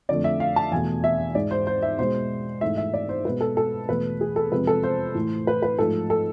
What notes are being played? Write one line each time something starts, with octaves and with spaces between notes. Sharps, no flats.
F2 D3 A3 D5
E5
F5
A5
E2 B2 A3 G#5
E5
G#2 G#3 D5
C5
C5
E5
B2 G#3 C5
G#2 E3 A3 E5
E5
D5
C5
B2 G#3 B4
A4
A4
E2 B2 A3 B4
G#4
A4
F2 C3 F3 G#3 B4
A4
C5
A2 E3 A3
B4
B4
G#2 F3 A3 A4
A4